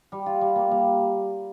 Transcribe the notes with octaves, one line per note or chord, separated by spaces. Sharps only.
G3
F4
G3
A#3
G3